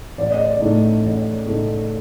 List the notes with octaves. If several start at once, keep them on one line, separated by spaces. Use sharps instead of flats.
A1 D5
D#5
D5
A2 A3 D#4
A1
A2 A3 D#4